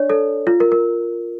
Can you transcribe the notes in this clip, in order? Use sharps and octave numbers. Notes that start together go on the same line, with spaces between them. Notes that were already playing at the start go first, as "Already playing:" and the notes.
Already playing: D4 C#5 D5
A4
F4
A#4
A#4